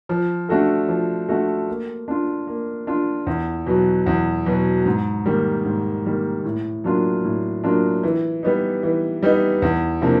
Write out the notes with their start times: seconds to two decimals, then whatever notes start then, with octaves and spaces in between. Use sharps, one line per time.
0.09 F3
0.49 A3 D4 F#4 A4
0.89 F3
1.29 A3 D4 F#4 A4
1.68 A#3
2.08 D4 F4
2.47 A#3
2.87 D4 F4
3.27 E2
3.66 B2 F#3
4.06 E2
4.46 B2 F#3
4.86 G#2
5.26 D#3 G3 A#3
5.65 G#2
6.05 D#3 G3 A#3
6.44 A2
6.84 F#3 A#3 D4 F4
7.24 A2
7.64 F#3 A#3 D4 F4
8.03 E3
8.43 G3 B3 D#4
8.83 E3
9.23 G3 B3 D#4
9.62 E2
10.02 C3 F3 A#3 D4